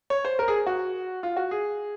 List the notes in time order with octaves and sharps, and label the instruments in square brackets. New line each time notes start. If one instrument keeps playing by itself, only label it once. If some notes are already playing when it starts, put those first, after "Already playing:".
[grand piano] C#5
C5
A#4
G#4
F#4
F4
F#4
G#4